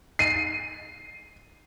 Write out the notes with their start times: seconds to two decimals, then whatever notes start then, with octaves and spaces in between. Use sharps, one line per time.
0.19 C7 D#7